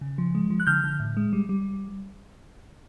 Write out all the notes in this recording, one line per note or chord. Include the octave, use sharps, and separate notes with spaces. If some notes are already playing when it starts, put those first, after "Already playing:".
C#3
F3
G#3
F3
F#6
D3 F6 G6
D3
A2
G#3
G3
G3